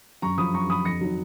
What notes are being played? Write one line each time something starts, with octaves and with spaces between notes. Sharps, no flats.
F#2 A#5 C#6
F3 B5 D#6
F#2 A#5 C#6
F3 B5 D#6
F2 A#6 C#7
D#3 F#3